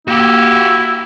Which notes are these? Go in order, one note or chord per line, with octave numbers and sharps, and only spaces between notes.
A#3 E4 F#4 G4